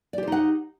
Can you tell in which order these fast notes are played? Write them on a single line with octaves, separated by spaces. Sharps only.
D5 G4 C5 D#4 F#5